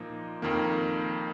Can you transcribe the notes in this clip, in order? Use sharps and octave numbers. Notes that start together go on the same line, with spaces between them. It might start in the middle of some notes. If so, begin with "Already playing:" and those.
Already playing: A#2 F3 A#3 D#4
F2 D#3 A#3